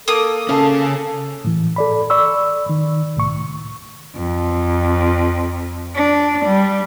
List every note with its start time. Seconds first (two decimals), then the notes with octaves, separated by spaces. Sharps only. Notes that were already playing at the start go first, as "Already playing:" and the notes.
0.08 A#3 A4 D#6
0.49 C#3 C#4 A4 F5 A5
1.44 A2 E3
1.76 A4 D5 B5
2.10 D5 B5 C#6 E6
2.69 D#3
3.17 C2 A2 C#6
4.16 F2
5.95 D4
6.46 G3